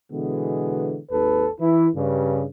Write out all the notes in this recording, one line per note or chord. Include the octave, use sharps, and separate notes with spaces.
B2 D3 E3 G#3 B3
G#1 D#2 A4 B4
E3 E4
G2 C#3